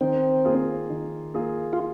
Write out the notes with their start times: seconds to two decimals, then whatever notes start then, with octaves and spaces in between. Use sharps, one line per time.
0.01 D#3 C4
0.45 A#3 F4 G#4
0.90 D#3
1.34 A#3 F4 G#4
1.73 F4